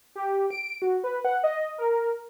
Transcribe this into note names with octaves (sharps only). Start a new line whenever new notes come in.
G4
D7
F#4
B4
F#5
D#5
A#4